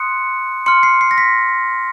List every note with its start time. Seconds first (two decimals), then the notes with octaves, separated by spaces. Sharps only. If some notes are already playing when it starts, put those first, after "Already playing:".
Already playing: C6 D#6 F#6 C#7
0.66 C6 F6 C#7
0.83 C7
1.01 C7
1.11 A#6
1.18 B6